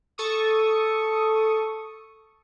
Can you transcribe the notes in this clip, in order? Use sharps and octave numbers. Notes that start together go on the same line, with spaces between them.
A4 C#6 D#6